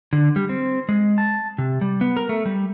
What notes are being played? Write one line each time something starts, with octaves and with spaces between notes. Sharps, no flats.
D3
G3
C4
G#3
A5
C3
G3
B3
A#4
A3
G3